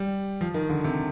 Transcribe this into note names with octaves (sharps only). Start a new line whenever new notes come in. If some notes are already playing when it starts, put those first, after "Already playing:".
Already playing: G3
F3
D#3
D3
C3